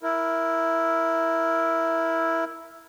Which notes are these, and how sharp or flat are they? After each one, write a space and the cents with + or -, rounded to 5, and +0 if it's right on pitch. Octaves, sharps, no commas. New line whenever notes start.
E4 +0 A#4 +0